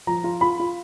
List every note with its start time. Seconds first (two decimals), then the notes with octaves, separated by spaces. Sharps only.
0.07 F3 A#5
0.24 F4
0.41 F4 B5
0.60 F4